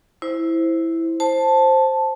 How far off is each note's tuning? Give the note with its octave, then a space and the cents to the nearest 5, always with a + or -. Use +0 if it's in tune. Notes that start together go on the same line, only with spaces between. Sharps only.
E4 +0 C5 +0
C5 +10 A5 +0